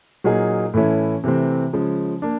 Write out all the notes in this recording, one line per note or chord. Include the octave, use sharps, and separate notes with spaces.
A#2 F#3 A#3 D#4 G#4
A2 E3 A3 C#4 E4
C3 E3 A3 C4
C#3 F3 G#3
A#3 D4